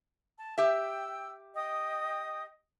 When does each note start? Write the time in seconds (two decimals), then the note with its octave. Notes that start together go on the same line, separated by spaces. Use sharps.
0.38 A5
0.58 G4 E5 G5 E6
1.55 D#5 G5 D#6